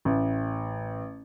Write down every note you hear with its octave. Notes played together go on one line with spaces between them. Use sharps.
A1